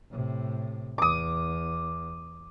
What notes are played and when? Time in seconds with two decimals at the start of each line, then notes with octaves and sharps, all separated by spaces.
0.10 A2 C3
0.98 E2 D6 D#6